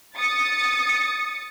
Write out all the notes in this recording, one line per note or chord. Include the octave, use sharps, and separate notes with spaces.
D#6 A6 C#7